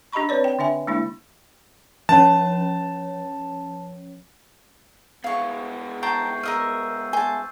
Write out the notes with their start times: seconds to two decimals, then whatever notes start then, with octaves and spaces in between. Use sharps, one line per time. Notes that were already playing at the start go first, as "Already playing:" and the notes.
0.12 D4 G4 D#5 A#5 B5 C#6
0.29 C4 B4 C#5 D5
0.44 G5
0.59 D3 D4 E5 G#5
0.87 G#3 A#3 D4 E4
2.09 F3 C#4 C#5 A5
5.24 G#3 B3 F5 C#6
6.03 G5 A5 A#5 C#6 G6 C7
6.43 A#4 D#5 E5 E6 F6 D#7
7.13 C5 G#5 A5